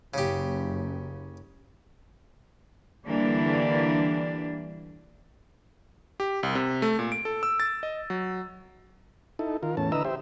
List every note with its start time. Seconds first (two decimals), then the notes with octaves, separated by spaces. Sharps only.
0.14 F#1 C#3 G4
3.07 D3 E3 G3 A#3 D4
6.20 G4
6.43 C2
6.55 C3
6.82 A3
6.99 A#2
7.12 D7
7.25 A4
7.43 E6
7.60 A6
7.83 D#5
8.10 F#3
9.39 D#4 E4 A4
9.63 D#3 F4 A#4
9.77 E2 A2 C#4 A5
9.92 D3 E4 B4 D#5 A#5 E6
10.05 G4 C5 E5